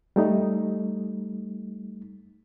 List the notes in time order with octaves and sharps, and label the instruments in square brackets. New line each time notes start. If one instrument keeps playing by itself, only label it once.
[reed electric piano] G3 A3 D#4